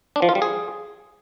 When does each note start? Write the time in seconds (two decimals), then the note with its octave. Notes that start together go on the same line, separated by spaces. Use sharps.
0.16 D4
0.22 F3
0.29 F4
0.35 G3
0.42 G#4